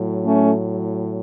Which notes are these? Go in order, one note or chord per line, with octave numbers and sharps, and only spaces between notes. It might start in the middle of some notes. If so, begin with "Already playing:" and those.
Already playing: A2 F#3
A3 C#4